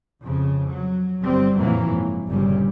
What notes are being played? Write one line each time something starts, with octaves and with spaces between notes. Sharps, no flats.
F2 C#3
F#3
G1 G3 C4
F#1 F2 A#2 E3 F#3 A#3
G#2
G1 G2 A#2 C#3 G3